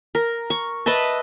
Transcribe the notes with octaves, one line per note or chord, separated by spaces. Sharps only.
A#4
C#6
B4 D#5 E5 A5